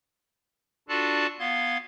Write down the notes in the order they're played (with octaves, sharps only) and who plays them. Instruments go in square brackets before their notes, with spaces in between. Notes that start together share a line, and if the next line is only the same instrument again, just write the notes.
[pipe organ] D4 F4 F#4 A4 D5 A5
B3 F5 C6 G#6